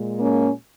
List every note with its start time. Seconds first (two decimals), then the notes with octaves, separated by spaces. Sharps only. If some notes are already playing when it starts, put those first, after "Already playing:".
Already playing: A#2 G#3
0.19 A#3 C#4